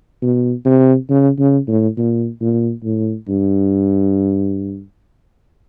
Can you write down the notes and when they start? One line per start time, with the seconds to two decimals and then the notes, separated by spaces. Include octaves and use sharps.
0.22 B2
0.65 C3
1.09 C#3
1.38 C#3
1.68 A2
1.97 A#2
2.41 A#2
2.84 A2
3.28 G2